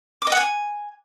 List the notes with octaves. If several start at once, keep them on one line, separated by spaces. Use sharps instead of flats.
D6
D#5
F#5
G#5